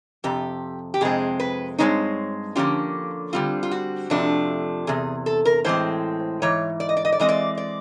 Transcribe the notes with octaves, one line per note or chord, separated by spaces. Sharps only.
F2 C3 G4
G4
F2 C3 G#3 C4 G#4
B4
G2 D#3 G#3 C4 D#4 C#5
D3 F3 A#3 C#4 F4 G4
D3 G3 C4 F4
F4
F#4
F2 C3 F3 A3 D4
E2 C3 G#4
A4
A#4
A2 E3 G#3 C4 C5
G#2 E3 C#5
D5
D#5
D5
D#5
D5
E3 G#3 C4 D#5
D5
D5